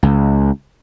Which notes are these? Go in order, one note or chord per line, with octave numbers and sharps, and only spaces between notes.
C#2